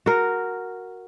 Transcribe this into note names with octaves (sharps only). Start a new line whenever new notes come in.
F#4 A#4